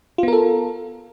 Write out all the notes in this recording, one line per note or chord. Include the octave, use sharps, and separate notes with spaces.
B3 F4 A4 A#4